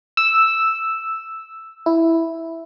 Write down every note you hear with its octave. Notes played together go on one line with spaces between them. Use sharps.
E6
E4